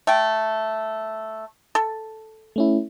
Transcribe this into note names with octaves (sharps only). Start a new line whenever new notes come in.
A3 G5
A4
A3 C#4 E4